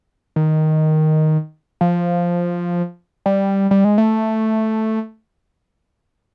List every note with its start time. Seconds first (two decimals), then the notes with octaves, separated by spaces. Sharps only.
0.36 D#3
1.81 F3
3.26 G3
3.71 G3
3.84 G#3
3.98 A3